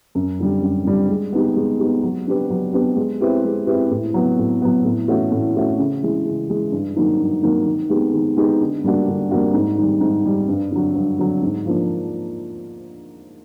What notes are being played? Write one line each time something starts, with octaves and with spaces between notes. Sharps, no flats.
F#2
D3 G3
F#2
D3 G3
G#3
B3 D#4 G4
G#3
B3 D#4 G4
F#3
B3 D4 G4 B4
F#3
B3 D4 G4 B4
G#3
C4 E4 G4 B4
G#3
C4 E4 G4 B4
A2
F#3 B3
A2
F#3 B3
A2
E3 A3 C#4 F#4
A2
E3 A3 C#4 F#4
C#3
E3 G#3
C#3
E3 G#3
G2
D#3 F#3 A#3 D#4
G2
D#3 F#3 A#3 D#4
D#3
G#3 B3 D#4 G4
D#3
G#3 B3 D#4 G4
D3
G3 A#3 D4 F#4
D3
G3 A#3 D4 F#4
G#2
D#3 G3
G#2
D#3 G3
G2
D3 F#3
G2
D3 F#3
G#2
F3 A#3 D4